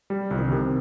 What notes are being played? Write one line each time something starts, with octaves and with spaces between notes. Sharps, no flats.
G3
C2 F3
D#3
D3
C3 D#3